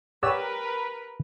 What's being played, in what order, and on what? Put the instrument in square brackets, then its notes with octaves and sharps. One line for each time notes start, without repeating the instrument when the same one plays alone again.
[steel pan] G4 E6 [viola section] A#4 B4 [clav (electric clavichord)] C#5 D5 F#5